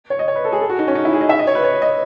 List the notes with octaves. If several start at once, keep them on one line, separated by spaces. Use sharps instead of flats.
C#5
D#5
C#5
B4
A4
G#4
A4
F#4
D#4
C#4
D#4
E4
G#4
D#5
E5
D#5
C#5
B4
C#5
D#5